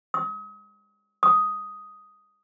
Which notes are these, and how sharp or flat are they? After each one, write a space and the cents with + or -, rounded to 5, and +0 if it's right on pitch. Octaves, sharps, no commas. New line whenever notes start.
D#6 +40
D#6 +5